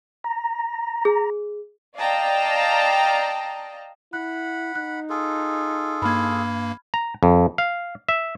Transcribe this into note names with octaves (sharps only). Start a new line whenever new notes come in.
A#5
G#4
D5 D#5 F5 G5 A5 A#5
E4 F#5 B5 F#6
D#4 F#6
F4 G#4 A4
G2 A#3 B5 F6 G#6
A#5
F2
F5
E5